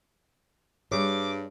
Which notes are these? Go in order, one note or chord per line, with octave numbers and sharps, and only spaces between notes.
G2 G3 G#4 C#5 D6